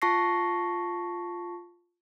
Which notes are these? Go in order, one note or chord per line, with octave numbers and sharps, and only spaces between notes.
F4 A5 C#6 A#6 C7